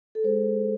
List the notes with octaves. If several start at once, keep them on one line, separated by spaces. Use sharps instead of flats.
A4
G#3 G#4 C5